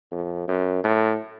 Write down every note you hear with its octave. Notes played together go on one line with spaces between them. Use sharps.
F2
F#2
A2